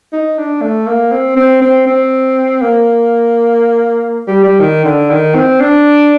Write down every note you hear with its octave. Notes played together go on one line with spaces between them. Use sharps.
D#4
D4
A3
A#3
C4
C4
C4
C4
A#3
G3
G3
D#3
D3
D#3
C4
D4